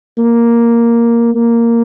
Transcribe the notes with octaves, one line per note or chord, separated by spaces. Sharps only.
A#3
A#3